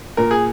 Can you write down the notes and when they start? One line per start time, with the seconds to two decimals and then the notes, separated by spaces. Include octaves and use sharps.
0.17 A#2 A#4
0.31 G#4